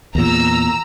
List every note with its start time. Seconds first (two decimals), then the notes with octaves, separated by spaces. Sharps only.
0.15 E2 A#2 A#5 E6